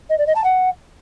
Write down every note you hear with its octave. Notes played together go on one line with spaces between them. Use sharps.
D#5
D5
D#5
A5
F#5